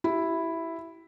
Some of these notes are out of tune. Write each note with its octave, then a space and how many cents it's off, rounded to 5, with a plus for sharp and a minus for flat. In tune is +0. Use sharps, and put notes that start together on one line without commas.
E4 +0 G4 -40